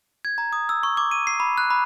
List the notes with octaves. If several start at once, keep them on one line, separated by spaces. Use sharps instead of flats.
G#6
A#5
D#6
E6
C#6
D6
D#7
C7
B5
F#6
B5